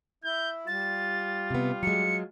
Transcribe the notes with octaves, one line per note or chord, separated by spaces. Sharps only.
E4 G6
G3 F4 A6
C3 B3
F#3 G#3 C#7